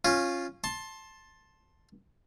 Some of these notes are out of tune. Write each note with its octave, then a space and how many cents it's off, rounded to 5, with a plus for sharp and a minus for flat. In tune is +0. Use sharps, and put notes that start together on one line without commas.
C#4 -15 F4 +0
A5 +0 C6 +15